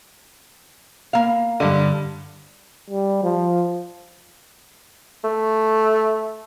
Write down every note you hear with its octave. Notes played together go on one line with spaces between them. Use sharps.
A#3 F5
G2 D3
G3
F3
A3